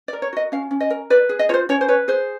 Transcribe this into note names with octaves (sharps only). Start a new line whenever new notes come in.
D5
A#4
C#5
F#4 D#5
C#4 F5
C#4
D#5
A#4
B4 D5
G#4
D#5
F4 C5 C#5
C#4 C#5
C5
B4 C#5
G#4 C5